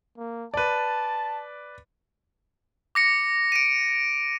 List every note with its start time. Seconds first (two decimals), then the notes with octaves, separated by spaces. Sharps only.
0.18 A#3
0.54 B4 D5 A5
2.95 D6 A#6 C#7
3.52 D7 D#7